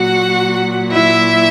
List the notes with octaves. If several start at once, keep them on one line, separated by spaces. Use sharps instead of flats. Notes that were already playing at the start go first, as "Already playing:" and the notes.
Already playing: A#2 F#3 F#4 F#5
E4 E5